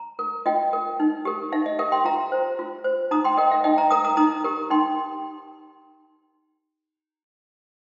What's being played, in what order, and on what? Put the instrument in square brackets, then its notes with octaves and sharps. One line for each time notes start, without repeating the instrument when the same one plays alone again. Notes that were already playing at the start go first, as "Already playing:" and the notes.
Already playing: [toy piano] A#5
A#4
F4 D#5 G5
A#4
D#4
G4 A#4
D#4 F5
D#5
G4 A#4 F5
G5 C6
F4 F5 A#5
C5
F4
C5
D#4 A#5 D#6
G5 C6
A#4 D#5 G5
F5
D#4 D#5 G5
F5 A#5
A#4 A#5 D#6
A#5 D#6
D#4 A#5 D#6
G4 A#4
D#4 G5 C6